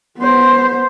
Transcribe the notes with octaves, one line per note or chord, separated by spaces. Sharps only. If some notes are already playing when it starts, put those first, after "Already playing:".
B3 C5